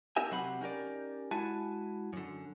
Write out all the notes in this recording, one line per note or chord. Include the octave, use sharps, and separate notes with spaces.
B3 D#4 G4 A#4 E5 G#5
C3 F#3 C4 G4 F#5 B5
C#4 D#4 G4 A#4 D5
G#3 E4 F#4 G#5 A5
F#2 D3